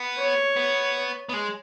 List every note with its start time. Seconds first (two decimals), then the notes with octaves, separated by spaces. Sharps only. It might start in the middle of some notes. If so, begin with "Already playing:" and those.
Already playing: B3
0.18 C#5
0.56 B3
1.29 B3
1.33 G#3